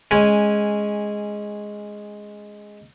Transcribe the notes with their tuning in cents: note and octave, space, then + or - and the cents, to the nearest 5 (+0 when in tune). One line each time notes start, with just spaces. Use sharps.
G#3 +0 C#4 -10